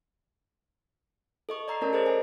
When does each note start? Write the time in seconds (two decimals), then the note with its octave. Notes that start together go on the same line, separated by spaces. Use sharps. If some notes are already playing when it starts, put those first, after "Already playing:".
1.49 A4 D#5 C#6
1.68 D5 D#5 A#5 E6 C7
1.81 A3 C#4 A#4 C#5 D5 A5
1.93 G#4 A4 C5 D#5 A6
2.06 A4 G#5